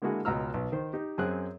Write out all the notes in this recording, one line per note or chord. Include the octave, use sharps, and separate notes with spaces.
D3 G#3 A#3 E4 F#4 G#4
C#2 B2 D#5 A#5 E6 F6
B1
D#3 C5
D#4 G4
F#2 C4 G#4 F#6